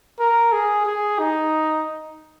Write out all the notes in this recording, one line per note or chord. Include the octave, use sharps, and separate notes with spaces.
A#4
G#4
G#4
D#4